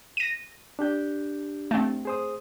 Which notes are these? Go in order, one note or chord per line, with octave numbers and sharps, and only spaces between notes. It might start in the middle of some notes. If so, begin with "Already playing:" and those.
A#6 D#7
D4 G4 G6
A3 C4
G#4 C5 D#6